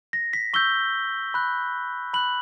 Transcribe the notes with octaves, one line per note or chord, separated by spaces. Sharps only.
A#6
B6
C#6 E6 G6 G7
B5 F#6
B5 F#6 F#7